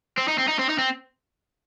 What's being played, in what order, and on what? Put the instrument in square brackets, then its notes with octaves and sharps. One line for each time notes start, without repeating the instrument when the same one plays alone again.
[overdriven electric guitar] C4
D#4
C4
D#4
C4
D#4
C4